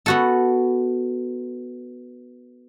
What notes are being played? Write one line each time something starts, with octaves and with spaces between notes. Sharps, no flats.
B3 F#4 A4